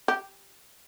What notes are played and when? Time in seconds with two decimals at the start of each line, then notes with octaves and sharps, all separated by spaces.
0.08 G4